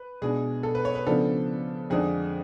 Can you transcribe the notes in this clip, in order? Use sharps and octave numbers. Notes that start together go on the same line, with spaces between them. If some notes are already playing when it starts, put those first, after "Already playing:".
Already playing: B4
B2 G#3 D4 G#4
A4
B4
C#5
B4
C#3 F3 B3 D4 A4
F2 D3 G#3 D4 G#4